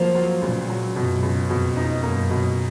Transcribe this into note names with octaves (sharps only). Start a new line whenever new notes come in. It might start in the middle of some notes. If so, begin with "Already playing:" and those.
Already playing: F3 F#3 A#3 F4
F#3
C#2 A#2
F#3
F#2 B2
C#2
F2 B2
D#4
F#2 A#3
B2